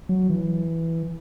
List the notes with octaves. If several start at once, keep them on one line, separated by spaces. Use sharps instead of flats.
F#3
E3